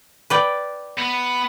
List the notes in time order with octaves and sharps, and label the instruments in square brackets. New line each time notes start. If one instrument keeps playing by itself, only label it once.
[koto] B4 D5 G5
[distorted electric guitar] B3